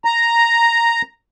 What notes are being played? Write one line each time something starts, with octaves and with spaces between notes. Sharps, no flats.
A#5